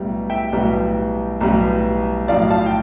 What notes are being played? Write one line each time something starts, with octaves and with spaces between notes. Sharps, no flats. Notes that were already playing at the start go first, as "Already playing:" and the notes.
Already playing: B1 A2 G3 B3
E5 G5
B1 A2 G3 B3
B1 A2 G3 B3
B1 A2 F3 D5 F5
F5 A5
G5